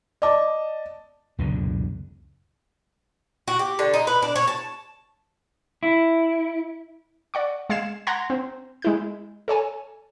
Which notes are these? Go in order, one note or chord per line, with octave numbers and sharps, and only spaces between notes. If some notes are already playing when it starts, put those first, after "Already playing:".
D5 D#5 A5 D6
C#2 F#2 B2 D3
F#4
G4
D3
D#4
B4
D4
C#5
A5
E4
D5 F#5 C#6
G#3 F5 G#6 C7 E7
F#5 A#5 C6 G#6 A#6
C4
G#3 E4 G6
A4 C#5 G#5 A5